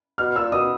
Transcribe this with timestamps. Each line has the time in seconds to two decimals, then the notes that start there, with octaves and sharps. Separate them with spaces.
0.18 B2 F6
0.36 A#2 E6
0.52 B2 D#6